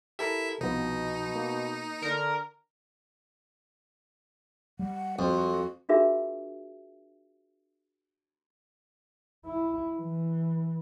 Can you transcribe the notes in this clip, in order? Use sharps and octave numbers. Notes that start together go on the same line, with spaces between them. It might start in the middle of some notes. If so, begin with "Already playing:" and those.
E4 G4 A4 A#4 E5
C2 B2 F3 B3 D#4
A#3
D3 A#4
G3 F#5
F2 F#4
D4 F4 F#4 G#4 A#4 E5
E4
E3